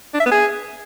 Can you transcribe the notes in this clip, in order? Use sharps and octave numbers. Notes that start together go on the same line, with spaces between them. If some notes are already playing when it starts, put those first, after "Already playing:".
D4
E5
B3
G#4